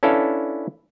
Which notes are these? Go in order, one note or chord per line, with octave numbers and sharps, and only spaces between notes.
C#4 D4 E4 A4 B4 F5